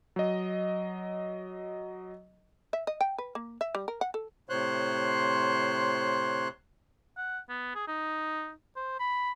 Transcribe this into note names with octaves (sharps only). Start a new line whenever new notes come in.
F#3 D#5
E5
D#5
G5
B4
A#3
E5
G3
A#4
F#5
A4
A2 C3 C5 C#5 C6 F#6
F#5
B3
G#4
D#4
C5
B5